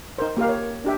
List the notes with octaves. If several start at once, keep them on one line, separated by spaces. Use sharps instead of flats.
D#4 A#4 C5
A#3 G4 A#4 F5
C#5
D4 G4 E5